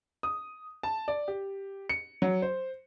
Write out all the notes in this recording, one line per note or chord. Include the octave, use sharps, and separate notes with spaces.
D#6
A5
D5
G4
C#7
F#3
C5